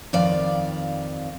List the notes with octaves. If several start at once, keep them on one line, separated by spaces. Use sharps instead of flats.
F2 D#3 D5 F5